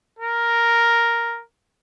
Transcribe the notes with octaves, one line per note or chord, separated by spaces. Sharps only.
A#4